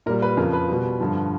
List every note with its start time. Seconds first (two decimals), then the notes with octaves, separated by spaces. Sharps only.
0.06 A#2 G3 A#4
0.22 B4
0.37 F2 C#3 F3 A#4
0.53 B4
0.68 B2 G3
1.00 G2 D3 F3